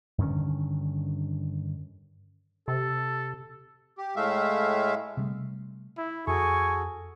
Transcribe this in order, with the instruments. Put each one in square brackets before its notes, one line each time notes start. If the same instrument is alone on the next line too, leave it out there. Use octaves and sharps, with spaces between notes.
[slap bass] G2 D3 D#3 C#4
[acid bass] C3 [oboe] A4
[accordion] G4
A2 G#3 A3 E5 F5
[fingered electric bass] C3 G3 A3
[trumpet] E4
[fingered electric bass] F2 [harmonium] F#4 G#4 A4 [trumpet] G#5 [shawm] C#6